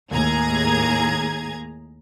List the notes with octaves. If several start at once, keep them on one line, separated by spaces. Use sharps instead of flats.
D#2 A2 G#4 A#5 G#6